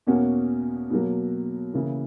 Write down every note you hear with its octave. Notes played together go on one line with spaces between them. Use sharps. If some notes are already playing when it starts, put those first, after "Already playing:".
E2 B2 A#3 C#4 F#4
B2 F#3 A#3
C#3 E3 A#3 E4